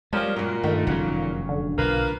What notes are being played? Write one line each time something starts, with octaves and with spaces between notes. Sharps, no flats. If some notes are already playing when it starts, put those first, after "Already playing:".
F3 G3 G#3 A#3 C#4 G4
F#2 A#2 F#3
G2 D#3 A3
F1 F#2 C#3 F#3 C#4
D3
B1 A#3 F4 B4